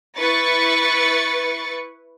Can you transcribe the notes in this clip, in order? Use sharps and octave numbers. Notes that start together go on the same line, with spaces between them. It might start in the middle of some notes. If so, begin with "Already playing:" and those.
E4 B4 C#6 A6 C#7